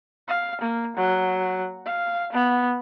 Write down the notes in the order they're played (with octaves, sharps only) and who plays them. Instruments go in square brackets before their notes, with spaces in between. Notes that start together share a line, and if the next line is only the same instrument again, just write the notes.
[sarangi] F5
A#3
F#3
F5
B3